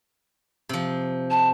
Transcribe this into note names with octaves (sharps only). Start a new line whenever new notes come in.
C3 F3
A5